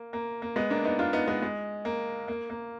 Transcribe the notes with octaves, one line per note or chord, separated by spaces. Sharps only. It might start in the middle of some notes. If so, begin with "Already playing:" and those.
Already playing: A#3
A#3
A#3
G#3 B3
A#3 D4
B3 D#4
D4 F4
B3 D#4
G#3 B3
G#3
A#3
A#3
A#3